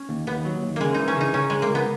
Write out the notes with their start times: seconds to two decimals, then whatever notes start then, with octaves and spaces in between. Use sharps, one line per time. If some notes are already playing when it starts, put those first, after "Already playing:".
Already playing: C#4
0.09 D#2
0.27 D#2 B3
0.45 F#3
0.63 D#2
0.76 C#3 G#3 A#3
0.94 E3 D#4
1.08 C#4
1.16 C#3 D#4
1.34 C#3 C#4
1.50 C#2 G#3
1.62 A#3
1.69 C#2
1.75 B3